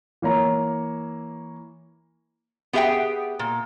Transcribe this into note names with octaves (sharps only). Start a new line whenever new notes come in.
E3 A#3 C#5 A#5
B3 G4 G#4 E5 F#5 G5
A#2